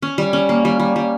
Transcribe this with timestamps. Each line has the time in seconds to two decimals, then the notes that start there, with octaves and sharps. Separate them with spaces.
0.02 C#4
0.18 G3
0.33 C#4
0.49 A#3
0.65 G3
0.80 G3
0.96 G3